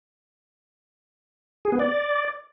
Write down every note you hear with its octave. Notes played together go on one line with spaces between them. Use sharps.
G#4
B3
D5